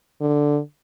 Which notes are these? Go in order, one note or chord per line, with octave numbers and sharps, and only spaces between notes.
D3